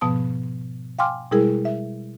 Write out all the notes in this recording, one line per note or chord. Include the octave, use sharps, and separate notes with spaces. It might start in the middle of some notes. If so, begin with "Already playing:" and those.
G#2 B2 F3 B3 A5 D#6
F5 G5 G#5 C6 D6 F6
B2 G3 G#3 E4 G#4 A#4
E5